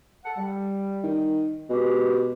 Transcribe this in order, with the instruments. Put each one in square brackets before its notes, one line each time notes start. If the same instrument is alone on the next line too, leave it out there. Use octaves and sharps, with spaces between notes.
[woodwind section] A4 F#5
G3
[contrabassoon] D#3
[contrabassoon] B2 [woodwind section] G#3 G4